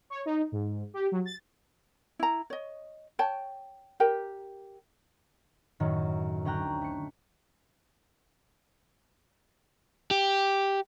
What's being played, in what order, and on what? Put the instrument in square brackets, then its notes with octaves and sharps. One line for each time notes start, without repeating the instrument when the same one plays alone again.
[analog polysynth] C#5
D#4
G#2
G4
F#3
A6
[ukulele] E4 A#5
C#5 D#5
C#5 G5 A5
G4 A#4 G5
[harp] F#2 A2 D#3 F#3
D2 C#4 G5 A#5 F#6
A3 C#7
[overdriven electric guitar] G4